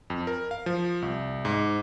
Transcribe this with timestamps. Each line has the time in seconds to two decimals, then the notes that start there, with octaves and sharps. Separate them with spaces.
0.10 F2
0.27 A#4
0.51 F5
0.66 F3
1.02 C2
1.45 G#2